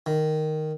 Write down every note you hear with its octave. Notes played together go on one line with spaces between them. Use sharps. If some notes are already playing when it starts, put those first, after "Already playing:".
D#3